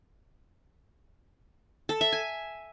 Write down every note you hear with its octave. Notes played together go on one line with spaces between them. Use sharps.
A4
E5
G#5